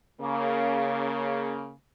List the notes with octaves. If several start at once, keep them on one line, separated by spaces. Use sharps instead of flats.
C#3 A#3